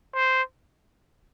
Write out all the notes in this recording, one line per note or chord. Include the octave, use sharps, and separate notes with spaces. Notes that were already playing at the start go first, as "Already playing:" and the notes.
C5